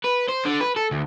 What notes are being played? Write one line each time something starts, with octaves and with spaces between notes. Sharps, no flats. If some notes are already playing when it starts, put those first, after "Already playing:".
B4
C5
D3
B4
A4
D2